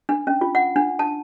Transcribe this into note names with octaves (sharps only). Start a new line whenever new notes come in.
D4
C#4
F4
F#5
D4
A5